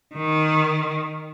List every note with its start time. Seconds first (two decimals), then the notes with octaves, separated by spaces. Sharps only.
0.15 D#3